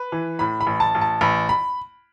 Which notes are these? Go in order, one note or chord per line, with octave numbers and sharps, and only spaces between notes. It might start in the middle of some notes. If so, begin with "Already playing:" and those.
Already playing: B4
E3
A2 B5
B5
A1
A5
A1
A5
A1 B5
B5